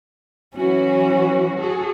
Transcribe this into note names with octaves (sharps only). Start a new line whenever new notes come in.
E3 F#3 C#4 F#4
F#4 G#4 A4